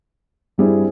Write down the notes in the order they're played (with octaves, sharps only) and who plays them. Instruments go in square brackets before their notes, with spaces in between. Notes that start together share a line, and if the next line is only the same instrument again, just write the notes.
[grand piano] G2 G3 C4 E4 G#4